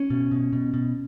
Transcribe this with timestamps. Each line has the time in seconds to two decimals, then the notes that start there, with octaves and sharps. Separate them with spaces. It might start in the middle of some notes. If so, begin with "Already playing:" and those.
Already playing: C#4
0.10 B2
0.31 B2
0.53 B2
0.74 B2